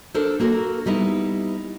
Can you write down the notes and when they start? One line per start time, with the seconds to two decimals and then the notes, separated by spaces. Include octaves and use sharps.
0.14 D4 A4 A#4 C5
0.40 A#3 F#4 A4 A#4
0.86 G3 B3 D#4 E4